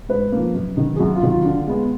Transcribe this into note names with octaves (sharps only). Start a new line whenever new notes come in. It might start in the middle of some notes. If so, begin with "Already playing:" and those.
G#2 B4
F3 A#3
F#2
D#3 F#3
G#4
F#2 F#4
F4
D#3 F#3
F4
D3
G#3 B3